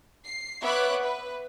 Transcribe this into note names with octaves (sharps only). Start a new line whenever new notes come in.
C7
B3 C#5 E5 B5 D6 F#6
B4